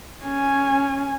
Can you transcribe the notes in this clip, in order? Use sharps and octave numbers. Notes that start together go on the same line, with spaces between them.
C#4 G#5